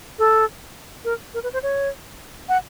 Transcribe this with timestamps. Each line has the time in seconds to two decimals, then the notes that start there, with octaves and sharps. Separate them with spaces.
0.19 A4
1.05 A#4
1.34 A#4
1.43 B4
1.53 C5
1.63 C#5
2.49 F#5